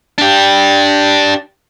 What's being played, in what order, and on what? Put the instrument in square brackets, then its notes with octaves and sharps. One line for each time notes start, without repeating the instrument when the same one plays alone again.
[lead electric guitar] D4 G4